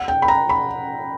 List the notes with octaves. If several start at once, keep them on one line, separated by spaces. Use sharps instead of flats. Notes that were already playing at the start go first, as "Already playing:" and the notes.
Already playing: F#5
G5
B5
A#5
B5